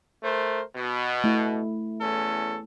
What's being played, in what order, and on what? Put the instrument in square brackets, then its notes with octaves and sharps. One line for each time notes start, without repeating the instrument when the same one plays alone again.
[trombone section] A3 A#4 C5
B2
[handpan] A3 E4
[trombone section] E2 C#4 A4